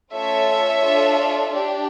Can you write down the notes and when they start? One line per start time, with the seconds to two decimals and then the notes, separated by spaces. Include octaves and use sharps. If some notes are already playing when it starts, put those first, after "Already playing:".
0.13 A3 C#4 F4 A4 C#5 E5
0.83 D4 F4 A4
1.52 D4 G4